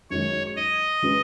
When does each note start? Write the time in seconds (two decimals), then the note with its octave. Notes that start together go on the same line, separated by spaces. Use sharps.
0.10 F#2 D#3 G#3 C#5
0.57 D#5
1.02 C#3 G#3 C#4 F#4 B4